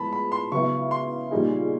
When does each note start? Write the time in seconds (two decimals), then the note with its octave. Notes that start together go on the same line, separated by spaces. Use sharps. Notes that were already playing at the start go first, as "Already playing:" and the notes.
Already playing: A2 F3 G#3 B3 A5 B5
0.12 B5
0.32 C6
0.52 C#3 F#3 B3 E4 C#6
0.91 C6
1.31 A#2 G3 A#3 D#4 G#4